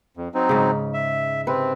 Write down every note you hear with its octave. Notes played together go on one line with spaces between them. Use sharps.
F2
F#3 C4 D#4
G#2 C#3
E5
C3 C4 B4